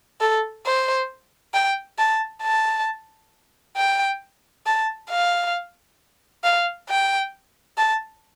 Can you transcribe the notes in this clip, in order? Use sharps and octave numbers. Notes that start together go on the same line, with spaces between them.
A4
C5
G5
A5
A5
G5
A5
F5
F5
G5
A5